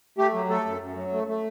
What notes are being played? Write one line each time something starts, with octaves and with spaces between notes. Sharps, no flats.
A3 G4
F#3
A3 A4
F#2
F#2
F#3
A3
A3